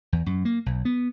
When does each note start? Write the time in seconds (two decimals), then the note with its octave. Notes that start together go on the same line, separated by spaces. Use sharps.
0.13 E2
0.26 F#2
0.45 A#3
0.66 B1
0.85 B3